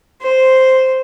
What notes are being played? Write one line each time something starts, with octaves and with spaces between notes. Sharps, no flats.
C5